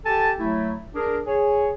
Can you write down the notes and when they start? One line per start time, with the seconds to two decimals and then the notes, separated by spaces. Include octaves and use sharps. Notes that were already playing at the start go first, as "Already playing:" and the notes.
0.05 G4 A4 G#5 A5
0.39 F#3 A3 E4
0.95 D4 G#4 A#4
1.27 G#4 C#5